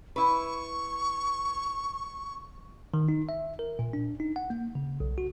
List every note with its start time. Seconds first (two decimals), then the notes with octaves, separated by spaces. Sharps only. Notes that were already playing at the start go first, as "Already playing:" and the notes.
0.16 E4 B4 C#6
2.94 D#3
3.09 D#4
3.29 E5
3.59 A#4
3.79 A#2
3.93 D4
4.20 D#4
4.36 F#5
4.50 A#3
4.75 C#3
5.00 B1
5.18 F#4